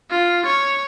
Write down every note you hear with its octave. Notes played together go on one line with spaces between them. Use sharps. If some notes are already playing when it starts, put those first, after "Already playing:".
F4
C#5